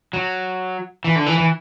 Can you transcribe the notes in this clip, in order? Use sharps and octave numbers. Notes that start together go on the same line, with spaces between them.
F#3
E3
D3
E3
E3